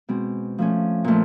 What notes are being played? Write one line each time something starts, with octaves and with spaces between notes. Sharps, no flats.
B2 G#3 C4
F3 A3 C#4
A#2 F3 A3